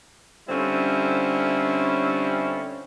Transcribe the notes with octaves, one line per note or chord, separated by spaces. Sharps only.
D3 G3 C4 C#4 E4 F4